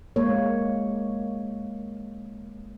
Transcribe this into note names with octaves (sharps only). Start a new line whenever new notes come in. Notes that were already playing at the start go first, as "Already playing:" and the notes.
G#3 A#3 C#5